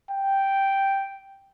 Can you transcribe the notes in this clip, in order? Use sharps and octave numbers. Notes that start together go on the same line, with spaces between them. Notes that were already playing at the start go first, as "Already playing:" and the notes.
G5